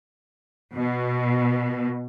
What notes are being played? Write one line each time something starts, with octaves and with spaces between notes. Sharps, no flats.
B2